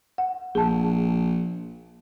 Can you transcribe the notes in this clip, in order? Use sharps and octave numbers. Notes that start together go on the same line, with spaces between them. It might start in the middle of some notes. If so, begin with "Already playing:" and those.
F#5
A#1 G#4 A5